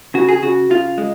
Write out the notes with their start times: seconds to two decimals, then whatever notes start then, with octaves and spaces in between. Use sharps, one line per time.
0.14 C#3 F#4
0.29 G#4
0.42 C#3 F#4
0.70 C#3 F4
0.98 G#3